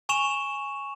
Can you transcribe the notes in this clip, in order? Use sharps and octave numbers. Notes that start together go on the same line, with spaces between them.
G#5 C#6 E7 F7